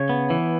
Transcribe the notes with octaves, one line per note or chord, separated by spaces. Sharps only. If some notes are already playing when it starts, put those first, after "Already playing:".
Already playing: C#3 C#5
B3
E3